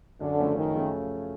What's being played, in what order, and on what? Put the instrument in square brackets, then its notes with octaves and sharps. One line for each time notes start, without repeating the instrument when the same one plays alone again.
[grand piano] F#2 [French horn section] D3
[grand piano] C#3 F3 A3 C#4
[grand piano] F#2 [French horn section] D#3
[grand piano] C#3 F3 A3 C#4